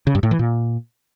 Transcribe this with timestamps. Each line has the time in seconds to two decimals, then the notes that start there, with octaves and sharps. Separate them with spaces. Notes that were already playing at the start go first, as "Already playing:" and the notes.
0.07 C#3
0.15 G2
0.23 A2
0.31 E3
0.39 A#2